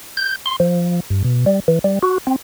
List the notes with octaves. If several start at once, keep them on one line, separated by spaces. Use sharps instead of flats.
G6
C6
F3
G2
B2
G3
E3
G3
F#4
C4